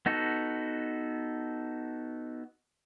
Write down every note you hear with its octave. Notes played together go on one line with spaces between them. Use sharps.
B3 D#4 F#4 A4